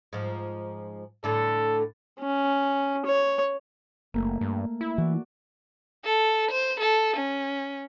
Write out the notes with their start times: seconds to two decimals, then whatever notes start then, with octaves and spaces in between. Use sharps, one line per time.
0.13 G#2 F3
1.24 A2 D3 A4
2.20 C#4
3.06 C#5
4.14 F#1 A3 A#3
4.41 G2
4.81 E4
4.98 E3 F#4 D5
6.05 A4
6.51 C5
6.80 A4
7.17 C#4